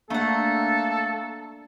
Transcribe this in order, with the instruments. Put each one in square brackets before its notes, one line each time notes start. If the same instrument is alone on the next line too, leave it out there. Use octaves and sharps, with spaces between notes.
[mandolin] A3 F#5 [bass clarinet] A#3 [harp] D4 [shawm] A4